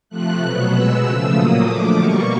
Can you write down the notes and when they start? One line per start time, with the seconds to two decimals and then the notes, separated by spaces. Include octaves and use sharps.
0.10 C3 F3 A3 F#6
0.41 B2 F#3 B3
0.72 B2 G#3 B3 E6
1.04 C#3 F3 A3
1.35 A#2 F#3 A#3 D#6
1.66 D3 F3 A3 D6
1.96 B2 G3 A#3 C#6